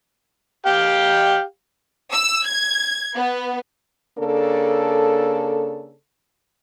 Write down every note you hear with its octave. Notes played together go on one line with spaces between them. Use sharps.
G4 F5 G5
E6
G#6
B3
C#3 A#3 D4 A4